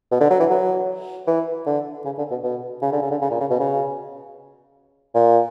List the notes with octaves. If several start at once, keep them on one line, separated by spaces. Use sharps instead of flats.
B2
D3
F#3
E3
F#3
E3
D3
C#3
D3
B2
B2
C#3
D3
C#3
D3
C#3
A#2
C#3
B2
C#3
A#2